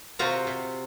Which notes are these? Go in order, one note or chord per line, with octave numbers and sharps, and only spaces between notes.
C3 C4 F4 F#4 A#5
C3